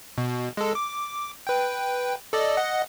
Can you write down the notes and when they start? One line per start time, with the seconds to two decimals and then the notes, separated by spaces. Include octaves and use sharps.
0.18 B2
0.57 G#3 A4
0.75 D6
1.47 B4 G5
2.33 A4 D5 D#5
2.57 D#5 F#5